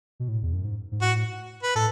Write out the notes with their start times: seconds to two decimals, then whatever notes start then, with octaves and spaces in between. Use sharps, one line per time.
0.20 B2
0.28 A2
0.42 E2
0.53 F#2
0.65 G#2
0.92 G#2
1.01 A2 F#4
1.63 B4
1.75 A2 A4